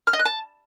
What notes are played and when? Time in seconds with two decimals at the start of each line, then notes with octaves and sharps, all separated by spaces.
0.07 F6
0.13 D#5
0.19 F#6
0.25 A5